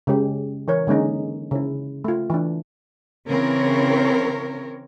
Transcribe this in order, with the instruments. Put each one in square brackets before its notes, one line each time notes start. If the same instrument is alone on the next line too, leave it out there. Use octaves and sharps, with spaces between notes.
[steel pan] C#3 G#3 G4
E3 A#4 C#5
D3 G#3 A#3 C#4 D#4
C#3 E4
A3 F4
E3 D4
[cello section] C#3 E3 C4 A#4 C#5